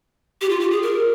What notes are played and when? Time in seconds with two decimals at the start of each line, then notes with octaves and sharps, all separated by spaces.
0.41 G4
0.49 F4
0.60 G4
0.71 G#4
0.82 A#4